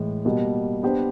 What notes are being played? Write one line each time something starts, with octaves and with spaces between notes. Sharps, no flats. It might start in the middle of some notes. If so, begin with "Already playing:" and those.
Already playing: A2 E3 G#3
B2 G3 A#3
B3 D4 G4 C5